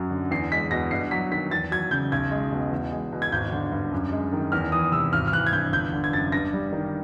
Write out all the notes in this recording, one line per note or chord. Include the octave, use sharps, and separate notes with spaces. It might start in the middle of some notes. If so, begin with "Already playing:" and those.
Already playing: F#2 F#3
D3
E2 C7
G#3 B6
B2 A#6
G2 C7
F#3 B6
D#3 B6
E2 A6
F#3 G#6
C#3 G6
B1 G#6
G#3
B2
E2
G#3
B2
G#6
G#1 G6
D3
G2
F#2
G#3
D#3
E2 F6
E3 D#6
C3 E6
G#1 F6
F6
E3 F#6
G#6
G2 G6
G1 G6
D3
G#6
F#2 A6
G2 A#6
G3
D#3